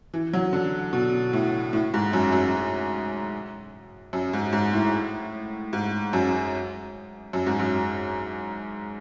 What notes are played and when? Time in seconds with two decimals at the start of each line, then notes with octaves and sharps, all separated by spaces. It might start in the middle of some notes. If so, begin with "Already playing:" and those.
0.14 E3
0.34 F#3
0.53 D3
0.93 B2
1.33 A2
1.73 A2
1.94 G#2
2.13 F#2
2.33 F#2
4.13 F#2
4.33 G#2
4.53 G#2
4.73 A2
5.73 G#2
6.13 F#2
7.33 F#2
7.46 G#2
7.60 F#2